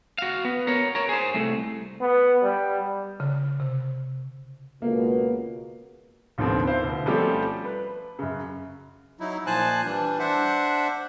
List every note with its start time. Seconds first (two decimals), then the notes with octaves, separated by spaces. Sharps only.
0.18 F#4 F5
0.45 B3
0.67 A#4 C#5
0.95 A#4 C#5
1.09 G#4 C5
1.34 C2 A3
2.01 B3
2.42 G3
3.20 C#3
3.60 C3
4.82 C#2 B2 A#3
6.38 A1 D#2 D3 F3 B3 C4
6.67 E4 C5 F5
6.84 D2 B2
7.06 F3 G3 A3 C4 C#4 G4
7.65 B4
8.19 F#2 C#3
9.20 F#3 D#4 E4
9.47 A#2 F3 C5 G#5 A5 F#6
9.85 E3 G3 D4
10.19 D4 C5 E5 F#5